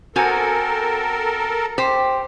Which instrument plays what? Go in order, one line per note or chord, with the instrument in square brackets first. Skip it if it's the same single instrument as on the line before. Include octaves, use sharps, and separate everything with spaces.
[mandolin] B3 C4 G#5 [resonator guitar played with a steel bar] F#4 [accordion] A4 A#4
[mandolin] G4 [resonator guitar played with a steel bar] C5